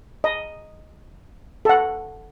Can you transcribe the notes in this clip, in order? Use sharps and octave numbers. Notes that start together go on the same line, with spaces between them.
D#5
A4 F#5